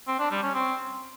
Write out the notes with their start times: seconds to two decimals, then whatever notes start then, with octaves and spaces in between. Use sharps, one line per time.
0.08 C4
0.19 D4
0.31 G3
0.43 C#4
0.55 C4